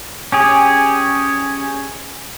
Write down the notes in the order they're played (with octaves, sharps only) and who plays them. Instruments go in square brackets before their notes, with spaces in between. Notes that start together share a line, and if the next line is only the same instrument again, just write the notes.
[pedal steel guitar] C#4 G4 G#4